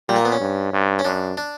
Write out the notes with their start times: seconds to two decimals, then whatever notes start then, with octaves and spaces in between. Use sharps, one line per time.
0.08 A#2 G3
0.16 A#3
0.25 B3
0.32 C#4
0.40 G2
0.73 G2
0.99 C#4
1.05 F#2 D4
1.37 D4